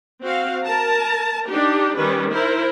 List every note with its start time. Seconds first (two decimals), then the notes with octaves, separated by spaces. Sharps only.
0.23 C4 F#4 F5
0.63 A#4 A5 A#5
1.49 D4 D#4 G4
1.98 D#3 G3 C#4 B4
2.32 E4 A#4 C5